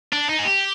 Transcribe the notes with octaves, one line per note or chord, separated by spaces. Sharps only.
D4
D#4
G#4
G4